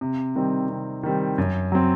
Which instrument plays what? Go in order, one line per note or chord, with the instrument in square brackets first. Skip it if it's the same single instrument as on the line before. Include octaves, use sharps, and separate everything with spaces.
[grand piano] C3
D#3 G3 C4
C3
D#3 G3 C4
F#2
F#3 C4